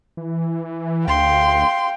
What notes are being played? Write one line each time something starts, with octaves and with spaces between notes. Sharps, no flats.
E3
D2 F5 G5 C6